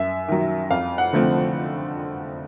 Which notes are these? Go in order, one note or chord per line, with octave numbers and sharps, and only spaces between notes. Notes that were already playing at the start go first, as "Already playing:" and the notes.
Already playing: F#2 E5
D#3 F#3
F2 F5
F#5
D3 F3 A3 C4